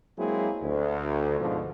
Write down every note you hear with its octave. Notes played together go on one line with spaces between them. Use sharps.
F#3 G#3 A#3 C4 E4 G#4
D2
G#2 B2 D3 F3